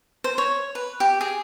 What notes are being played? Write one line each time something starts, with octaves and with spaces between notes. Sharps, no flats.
C5
C#5
B4
G4
G#4